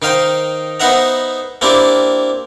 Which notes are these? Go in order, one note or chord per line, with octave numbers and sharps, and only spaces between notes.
D#3 D#4 C5 F5 G5
B3 D#4 C5 E5 F#5 A#5
A#3 C4 D4 E4 G4